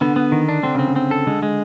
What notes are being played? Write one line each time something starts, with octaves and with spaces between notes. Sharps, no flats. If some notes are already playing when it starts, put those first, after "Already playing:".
D3 B3
B3
D#3
D4
D3 C4
C#3 C4
D3
C4
A4
D3 G#3
G#3